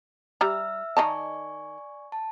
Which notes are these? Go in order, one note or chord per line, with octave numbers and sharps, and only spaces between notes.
G3 E5 A#5 E6 F6
D#3 D#4 D5 G#5 A5 C#6
A5